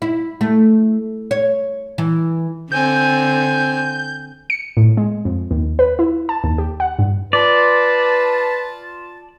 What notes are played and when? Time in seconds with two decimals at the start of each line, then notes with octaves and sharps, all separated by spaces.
0.02 E4
0.41 A3
1.31 C#5
1.98 E3
2.72 D3 C4 G#5 G6
4.50 C#7
4.77 A2
4.97 G#3
5.25 F2
5.51 D#2
5.79 B4
5.99 E4
6.29 A5
6.44 D#2
6.58 G4
6.80 F#5
6.99 G2
7.33 F4 B4 D5 A5